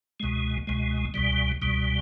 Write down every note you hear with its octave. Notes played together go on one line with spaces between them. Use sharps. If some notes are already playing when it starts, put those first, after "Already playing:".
C#2 B2 G#3
C#2 B2 G#3
C#2 B2 G3
C#2 B2 G3